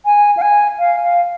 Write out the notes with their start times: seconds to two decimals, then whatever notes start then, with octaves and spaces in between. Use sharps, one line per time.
0.05 G#5
0.37 F5
0.42 G#5
0.79 F5
1.03 F5